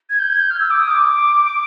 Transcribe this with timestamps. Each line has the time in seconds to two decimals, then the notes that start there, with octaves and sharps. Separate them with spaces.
0.10 G#6
0.19 G6
0.29 G#6
0.39 G6
0.50 F6
0.60 E6
0.71 D6
0.80 D#6
0.90 D6